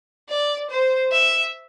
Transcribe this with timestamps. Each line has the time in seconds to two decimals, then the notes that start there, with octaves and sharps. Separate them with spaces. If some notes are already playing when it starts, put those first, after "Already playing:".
0.30 D5
0.71 C5
1.14 E5